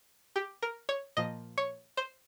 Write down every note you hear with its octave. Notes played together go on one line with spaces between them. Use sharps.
G4
A#4
C#5
A#2 F3 D#5
C#5
C5